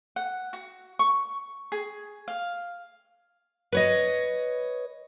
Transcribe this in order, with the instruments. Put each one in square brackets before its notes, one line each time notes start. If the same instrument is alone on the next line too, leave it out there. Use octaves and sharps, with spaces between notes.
[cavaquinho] F#5
F#4
C#6
G#4
F5
[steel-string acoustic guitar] B4 C#5 D#5